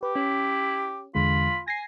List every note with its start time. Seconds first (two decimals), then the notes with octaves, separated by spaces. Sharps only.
0.03 G4 B4
0.16 C#4 E4
1.15 E2 D3 G#3 F4 B5
1.68 G#5 A#6 C7